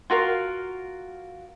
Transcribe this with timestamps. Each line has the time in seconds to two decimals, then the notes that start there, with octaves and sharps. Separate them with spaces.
0.10 F4 F#4 A#4 F5